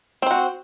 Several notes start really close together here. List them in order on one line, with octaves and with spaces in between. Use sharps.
C4 C5 F#4